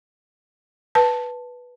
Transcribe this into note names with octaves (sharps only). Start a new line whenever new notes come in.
B4 A5